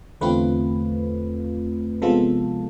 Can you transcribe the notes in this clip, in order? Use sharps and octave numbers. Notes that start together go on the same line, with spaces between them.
E2 D3 A3 C4 F4 B4
C3 F3 G#3 B3 F4 A4